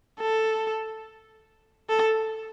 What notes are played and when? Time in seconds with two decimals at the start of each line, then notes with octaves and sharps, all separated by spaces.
0.20 A4
1.89 A4